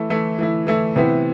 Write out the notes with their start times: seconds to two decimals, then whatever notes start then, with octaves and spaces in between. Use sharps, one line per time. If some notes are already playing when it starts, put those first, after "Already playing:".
Already playing: E3 A3 E4
0.10 E3 A3 E4
0.39 E3 A3 E4
0.67 E3 A3 E4
0.96 C3 E3 B3 E4